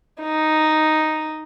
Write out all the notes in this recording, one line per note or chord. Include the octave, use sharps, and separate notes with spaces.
D#4